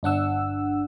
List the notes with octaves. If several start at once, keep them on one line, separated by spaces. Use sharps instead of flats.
G1 D4 F#5 E6